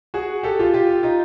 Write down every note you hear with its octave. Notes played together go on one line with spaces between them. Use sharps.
F#4 G#4
G4 A4
F4 G4
F4 G4
D#4 F4